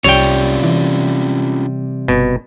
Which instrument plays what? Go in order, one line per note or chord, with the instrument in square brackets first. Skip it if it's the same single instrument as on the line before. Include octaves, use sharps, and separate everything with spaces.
[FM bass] C2 [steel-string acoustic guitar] C3 G3 [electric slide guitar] C#4 F4 G4 [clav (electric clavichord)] C#5 G5
[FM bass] E3
[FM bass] G1 [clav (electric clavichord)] B2